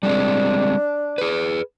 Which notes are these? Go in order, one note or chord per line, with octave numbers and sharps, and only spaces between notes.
G3 G#3 C4 D4
G#4 B4